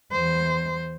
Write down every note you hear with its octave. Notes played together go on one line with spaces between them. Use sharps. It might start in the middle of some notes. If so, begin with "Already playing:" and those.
E2 C5